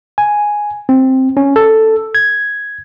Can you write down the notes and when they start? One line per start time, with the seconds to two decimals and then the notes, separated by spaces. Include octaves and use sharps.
0.18 G#5
0.89 C4
1.37 C#4
1.56 A4
2.15 G#6